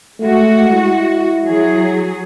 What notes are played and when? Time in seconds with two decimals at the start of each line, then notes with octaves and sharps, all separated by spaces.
0.20 G#3 A3 F#4
0.72 E4
1.43 F#3 G#4